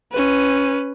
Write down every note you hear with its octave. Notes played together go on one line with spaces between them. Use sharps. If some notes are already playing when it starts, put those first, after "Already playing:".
C#4 B4